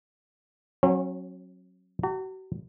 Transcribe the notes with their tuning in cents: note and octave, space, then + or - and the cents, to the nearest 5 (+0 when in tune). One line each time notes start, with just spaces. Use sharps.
F#3 -5 C#4 -40
F#4 +40 A#5 -40